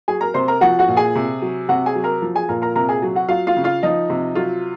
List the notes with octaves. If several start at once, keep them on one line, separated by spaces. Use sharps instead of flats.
F#3 G#4 G#5
A#4 A#5
C3 C5 C6
A#4 A#5
F3 F#4 F#5
F#4 F#5
A#2
G#4 G#5
C3
F#3
C3 F#4 F#5
G#4 G#5
F#3
A#4 A#5
F3
G#4 G#5
A#2 A#4 A#5
A#4 A#5
C3 A#4 A#5
G#4 G#5
F#3
F#4 F#5
F#3 F4 F5
F4 F5
C#3
F4 F5
F3 D#4 D#5
C3
F#3 F4